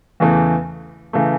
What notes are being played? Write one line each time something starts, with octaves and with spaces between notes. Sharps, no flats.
E2 C#3 E3 A3
C#3 E3 A3